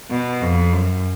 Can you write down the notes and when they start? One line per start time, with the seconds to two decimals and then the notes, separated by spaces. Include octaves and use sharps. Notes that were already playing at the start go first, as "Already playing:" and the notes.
0.11 B2
0.42 F2
0.73 F#2